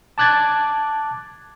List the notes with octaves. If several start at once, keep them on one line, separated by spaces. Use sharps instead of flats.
A5 D6 F#6 G#6 A6